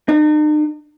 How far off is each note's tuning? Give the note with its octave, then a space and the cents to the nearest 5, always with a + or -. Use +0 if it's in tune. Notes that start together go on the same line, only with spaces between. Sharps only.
D#4 -45